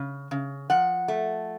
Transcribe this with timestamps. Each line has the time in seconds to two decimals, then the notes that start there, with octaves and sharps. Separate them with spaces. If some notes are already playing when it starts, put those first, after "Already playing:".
Already playing: C#3
0.31 C#3
0.70 F3 F#5
1.08 A3